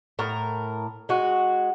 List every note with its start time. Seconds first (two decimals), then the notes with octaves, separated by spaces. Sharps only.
0.19 A2 A#4
1.09 G#3 F#4